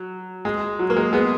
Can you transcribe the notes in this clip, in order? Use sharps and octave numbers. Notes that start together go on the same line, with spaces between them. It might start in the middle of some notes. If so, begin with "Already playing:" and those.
Already playing: F#3
G#3
F#3
A#3
G#3
G#3 B3